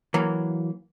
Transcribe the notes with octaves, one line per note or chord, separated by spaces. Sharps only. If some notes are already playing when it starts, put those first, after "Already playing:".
E3 F#3 A#3